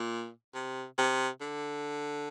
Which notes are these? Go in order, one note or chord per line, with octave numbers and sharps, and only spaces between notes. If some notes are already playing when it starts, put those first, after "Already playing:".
Already playing: A#2
C3
C3
D3